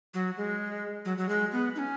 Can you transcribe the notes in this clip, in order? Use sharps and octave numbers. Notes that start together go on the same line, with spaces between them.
F#3
G#3
F#3
F#3
G#3
B3
D#4
C#4